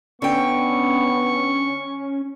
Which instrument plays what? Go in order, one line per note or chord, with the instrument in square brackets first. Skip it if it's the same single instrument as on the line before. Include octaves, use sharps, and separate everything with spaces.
[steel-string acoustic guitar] D3 G5 [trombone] B3 [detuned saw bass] C#4 [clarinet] C#6